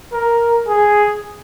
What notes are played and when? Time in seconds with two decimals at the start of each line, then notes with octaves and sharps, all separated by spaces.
0.13 A#4
0.68 G#4